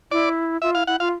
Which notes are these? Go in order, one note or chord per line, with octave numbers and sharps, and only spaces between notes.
E4 D5
F4 E5
E4 F5
E4 F#5
F4 F5